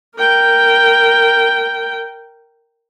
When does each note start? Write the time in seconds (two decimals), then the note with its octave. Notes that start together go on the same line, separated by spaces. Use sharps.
0.16 A#4 G5